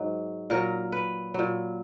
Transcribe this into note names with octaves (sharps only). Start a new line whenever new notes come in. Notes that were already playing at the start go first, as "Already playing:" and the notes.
Already playing: G#2 F#3
A#2 F#3 A#4
B4
A#2 F#3